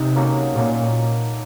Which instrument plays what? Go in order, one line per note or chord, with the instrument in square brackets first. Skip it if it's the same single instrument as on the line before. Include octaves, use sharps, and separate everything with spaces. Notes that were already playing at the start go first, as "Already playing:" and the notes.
Already playing: [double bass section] C3 [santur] D#4
[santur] F#3 A#3 C#4 A4
[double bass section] A#2 [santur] F#3 A#3 C#4 A4